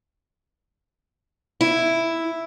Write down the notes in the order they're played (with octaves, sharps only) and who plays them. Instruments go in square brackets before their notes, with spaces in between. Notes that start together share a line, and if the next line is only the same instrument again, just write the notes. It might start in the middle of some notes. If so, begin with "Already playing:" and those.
[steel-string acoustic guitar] E4